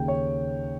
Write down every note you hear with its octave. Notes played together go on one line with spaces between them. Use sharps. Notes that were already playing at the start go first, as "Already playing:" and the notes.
Already playing: D#2 C#3 G5
C#5